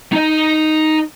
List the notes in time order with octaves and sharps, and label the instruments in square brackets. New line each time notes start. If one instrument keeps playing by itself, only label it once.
[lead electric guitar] D#4 D#5